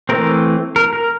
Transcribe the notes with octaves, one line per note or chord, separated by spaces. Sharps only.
E3 A3 C4 A#4
A#4
A#4